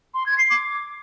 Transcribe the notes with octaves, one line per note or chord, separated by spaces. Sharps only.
C6
G#6
C7
D6